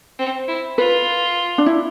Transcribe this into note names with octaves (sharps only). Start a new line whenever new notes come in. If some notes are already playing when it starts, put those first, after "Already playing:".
C4
E4
F4 B4
D4
E4